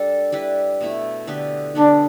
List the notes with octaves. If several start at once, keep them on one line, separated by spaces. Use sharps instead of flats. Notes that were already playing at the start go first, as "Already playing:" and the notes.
Already playing: G3 D4 A4
G3 E4 B4
B2 A3 E4
D3 B3 G4 B4
D3 G3 B3 D4